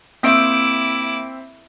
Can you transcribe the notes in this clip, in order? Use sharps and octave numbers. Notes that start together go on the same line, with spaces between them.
A#3 C4 E4 E5 D6 E6 D7